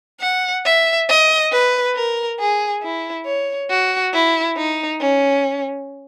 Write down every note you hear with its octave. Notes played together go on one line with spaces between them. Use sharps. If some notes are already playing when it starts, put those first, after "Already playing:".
F#5
E5
D#5
B4
A#4
G#4
E4
C#5
F#4
E4
D#4
C#4